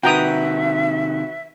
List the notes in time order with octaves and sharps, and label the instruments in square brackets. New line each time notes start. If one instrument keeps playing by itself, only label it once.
[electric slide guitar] C3 D#3 [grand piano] F#4 B4 [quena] E5 [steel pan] G5 A#5 D#6